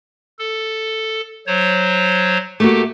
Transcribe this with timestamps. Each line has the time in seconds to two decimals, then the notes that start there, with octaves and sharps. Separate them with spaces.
0.39 A4
1.47 F#3 C5 C#5
2.60 A3 A#3 F#4 G4